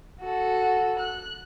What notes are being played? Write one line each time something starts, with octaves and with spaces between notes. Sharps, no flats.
F#4 A4
F#6